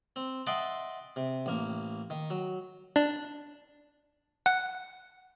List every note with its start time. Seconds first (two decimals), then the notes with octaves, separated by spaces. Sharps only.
0.16 C4
0.47 D#5 E5 F#5 G5 A5 C6
1.16 C3
1.46 A1 A#3
2.10 D#3
2.30 F#3
2.96 D4
4.46 F#5